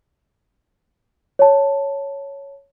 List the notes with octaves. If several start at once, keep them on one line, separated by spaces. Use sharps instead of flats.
C#5 A5